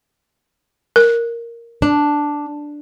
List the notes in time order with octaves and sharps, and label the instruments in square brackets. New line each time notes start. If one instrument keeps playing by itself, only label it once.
[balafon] A#4
[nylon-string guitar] D4